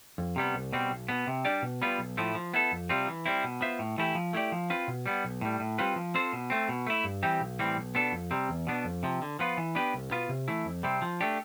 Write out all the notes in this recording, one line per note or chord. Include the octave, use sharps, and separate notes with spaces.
F2
C3 G3 B3
C2
B2 G3 C4
B1
B2 B3
C3
G3 D4 G4 D5
B2
G3 B3 F4 B4
B1
A2 F3 A3 E4
F3
B3 E4 A4
F2
C3 G3 C4 F4
E3
G3 C4 E4
B2
B3 F4 C5 E5
A2
E3 A3 E4 G4
F3
A3 E4 G4 D5
F3
C4 F4 B4
B2
G3 B3
B1
A2 G3
A2
G3 C4 F4 B4
F3
C4 F4 A4 C5
B2
A3 C4
B2
A3 E4
G2
E3 G3 C4 G4
B1
A2 E3 G3 C4
B1
B2 B3 D4 A4
F2
C3 G3 C4
E2
B2 B3 D4
F2
C3 F3
D3
F3 B3 F4 B4
E3
B3 D4 G4 B4
C2
B2 B3 F4 B4
C3
E3 A3 E4
F2
C3 G3 C4
F3
A3 D4 G4